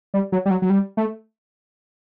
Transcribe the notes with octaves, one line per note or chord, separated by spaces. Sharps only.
G3
F#3
G3
F#3
F#3
G3
A3